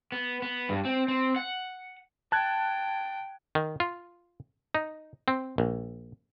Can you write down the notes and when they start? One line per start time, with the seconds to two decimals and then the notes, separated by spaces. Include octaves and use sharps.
0.12 B3
0.42 B3
0.69 G2
0.85 C4
1.08 C4
1.36 F#5
2.32 G5 A5 F#6 G#6
3.55 D#3
3.80 F4
4.75 D#4
5.28 C4
5.58 A#1